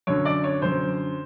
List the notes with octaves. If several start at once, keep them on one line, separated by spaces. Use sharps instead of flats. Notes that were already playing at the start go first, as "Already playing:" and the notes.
F#2 D3 C#5
D5
C#5
F#2 D3 C5